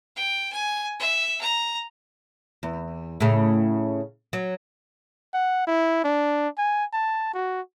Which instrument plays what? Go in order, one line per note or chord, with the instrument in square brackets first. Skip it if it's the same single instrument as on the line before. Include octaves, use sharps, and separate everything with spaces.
[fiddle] G5
G#5
E5
A#5
[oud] E2
A2 C#3
F#3
[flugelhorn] F#5
E4
D4
G#5
A5
F#4